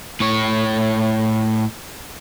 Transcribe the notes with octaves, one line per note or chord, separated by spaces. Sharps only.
A2 C#5